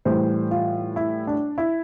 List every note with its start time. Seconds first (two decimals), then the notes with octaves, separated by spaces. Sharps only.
0.05 A2 E3 G3 C5
0.51 F4
0.96 E4
1.27 D4
1.58 E4